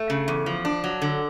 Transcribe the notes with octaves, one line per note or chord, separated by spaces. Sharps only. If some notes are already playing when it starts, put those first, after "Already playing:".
Already playing: A3
C#3
E2
F3
D4
F#3
D3